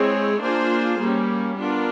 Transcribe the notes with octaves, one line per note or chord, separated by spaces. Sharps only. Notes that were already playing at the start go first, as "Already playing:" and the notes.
Already playing: G#3 C4 E4 G#4 C#5
A#3 D4 F4 G#4 C5
G3 A#3 C#4
B3 D4 F4 A#4